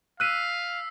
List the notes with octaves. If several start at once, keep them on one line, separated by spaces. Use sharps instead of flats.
F5 E6 F#6 B6 D#7